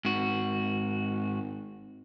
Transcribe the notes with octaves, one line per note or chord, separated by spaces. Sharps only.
G#1 G#2 F#4